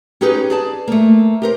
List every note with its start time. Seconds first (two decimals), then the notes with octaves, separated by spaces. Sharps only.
0.21 C#4 D#4 G4 G#4 B4
0.50 G#4 D5 A5
0.88 A3 A#3
1.42 G4 A#4 C5